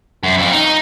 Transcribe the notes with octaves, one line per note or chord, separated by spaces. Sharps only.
F#2
F2
D#4